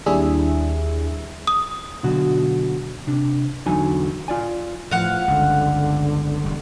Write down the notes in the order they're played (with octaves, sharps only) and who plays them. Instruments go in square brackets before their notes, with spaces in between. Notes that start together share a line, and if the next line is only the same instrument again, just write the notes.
[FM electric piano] D#2 G3 D4 E4 G#4 E5
[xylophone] D#6
[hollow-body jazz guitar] B2 D3 F#3 F#4
C3 D4
E2 D3 F#3 D#4 G#5
F4 D5 G#5
[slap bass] A2 E3 [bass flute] F3 [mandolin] F5 F#5
[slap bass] G1 C#2 [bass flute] D3
[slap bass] E1 G3